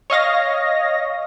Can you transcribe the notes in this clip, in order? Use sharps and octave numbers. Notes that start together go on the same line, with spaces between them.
C#5 D#5 F5 A#6